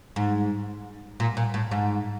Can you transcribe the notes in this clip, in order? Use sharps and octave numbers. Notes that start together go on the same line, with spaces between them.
G#2
A#2
A#2
A2
G#2